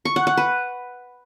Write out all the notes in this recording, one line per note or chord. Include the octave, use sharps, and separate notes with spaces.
C#6
F#5
F#5
B4